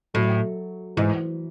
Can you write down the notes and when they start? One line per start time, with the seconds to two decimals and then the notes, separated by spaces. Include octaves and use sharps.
0.14 A2 F#3
0.97 G#2 E3